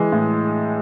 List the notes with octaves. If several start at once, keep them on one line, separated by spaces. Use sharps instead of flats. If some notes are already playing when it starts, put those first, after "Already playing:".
Already playing: E3 G#3
A2